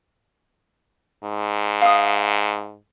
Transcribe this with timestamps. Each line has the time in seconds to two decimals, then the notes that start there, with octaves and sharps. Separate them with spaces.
1.24 G#2
1.81 F5 D#6